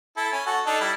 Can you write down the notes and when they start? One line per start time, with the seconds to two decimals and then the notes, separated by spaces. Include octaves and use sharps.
0.17 E4 A4
0.32 C#4
0.46 F#4 A4
0.66 D4 D#4 A4
0.81 G3 E4